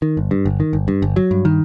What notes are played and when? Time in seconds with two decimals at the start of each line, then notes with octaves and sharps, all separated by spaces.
0.02 D#3
0.17 G1
0.31 G2
0.46 G1
0.60 D#3
0.73 G1
0.88 G2
1.02 G1
1.16 F#3
1.31 G2
1.45 D#3